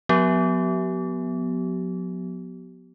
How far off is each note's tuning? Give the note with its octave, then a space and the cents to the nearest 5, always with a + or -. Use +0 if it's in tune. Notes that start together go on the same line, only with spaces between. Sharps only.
F#3 -45 B3 +0 G4 -35